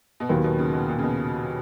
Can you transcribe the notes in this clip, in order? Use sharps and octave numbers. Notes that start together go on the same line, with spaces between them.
B2
D#2 A#2 D#3 F#3 B3
B2
C#3
B2
A#2
C#3
B2